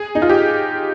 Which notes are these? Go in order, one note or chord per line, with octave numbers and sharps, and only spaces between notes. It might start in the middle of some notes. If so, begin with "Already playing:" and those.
Already playing: G#4
D#4
F4
G4